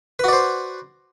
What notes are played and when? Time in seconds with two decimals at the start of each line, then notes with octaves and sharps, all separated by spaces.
0.19 B4
0.24 F#4
0.28 D5
0.33 C5